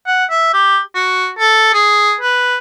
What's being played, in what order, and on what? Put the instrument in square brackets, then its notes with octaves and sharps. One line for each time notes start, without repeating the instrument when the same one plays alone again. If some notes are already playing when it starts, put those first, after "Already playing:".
[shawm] F#5
E5
G4
F#4
A4
G#4
B4